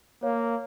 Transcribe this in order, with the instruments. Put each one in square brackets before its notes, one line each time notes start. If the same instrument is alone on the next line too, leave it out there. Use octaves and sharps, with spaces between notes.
[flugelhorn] A#3 [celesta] C#5 F5